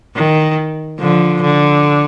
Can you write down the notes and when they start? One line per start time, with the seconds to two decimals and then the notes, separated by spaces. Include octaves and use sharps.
0.16 D#3
1.00 D3 F3
1.42 D3